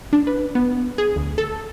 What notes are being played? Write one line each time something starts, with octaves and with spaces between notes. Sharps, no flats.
D4
B4
B3
G#4
D2
A4